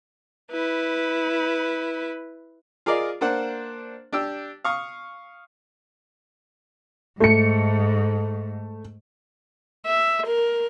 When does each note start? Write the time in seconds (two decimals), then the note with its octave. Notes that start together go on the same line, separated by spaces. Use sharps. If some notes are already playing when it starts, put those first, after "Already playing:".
0.51 E4 B4
2.86 F4 G#4 A#4 D5 D#5
3.21 A#3 D4 C5 F#5
4.13 D4 G4 G5 E6
4.64 F5 C#6 D#6
7.20 G#2 A3 C#7
9.86 E5
10.27 A#4